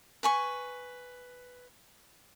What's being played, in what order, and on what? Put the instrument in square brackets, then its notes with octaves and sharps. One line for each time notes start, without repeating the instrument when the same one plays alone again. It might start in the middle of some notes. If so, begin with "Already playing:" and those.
[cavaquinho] B4 G#5 C#6